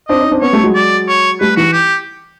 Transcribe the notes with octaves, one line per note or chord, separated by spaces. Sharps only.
C4 D4 D#5
C#4 D#4
C4 D4
B3 C#4 C#5
G3 A3
F#3 G#3
D5
C#5
G3 A3 B4
E3 F#4
G4